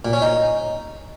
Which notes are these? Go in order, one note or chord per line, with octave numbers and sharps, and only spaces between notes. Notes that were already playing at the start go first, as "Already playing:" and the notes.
A#2
C#4
D#4